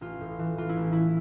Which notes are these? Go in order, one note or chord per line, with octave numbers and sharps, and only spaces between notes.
A1 F4
A2
E3
E3 F4
E4
A1
E4